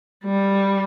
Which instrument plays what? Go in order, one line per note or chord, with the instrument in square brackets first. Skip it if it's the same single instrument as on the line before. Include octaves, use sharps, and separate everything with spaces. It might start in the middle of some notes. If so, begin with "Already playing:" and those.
[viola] G3